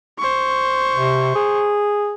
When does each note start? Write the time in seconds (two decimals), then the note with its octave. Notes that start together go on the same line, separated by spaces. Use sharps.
0.19 C5 C#6
0.95 C3
1.35 G#4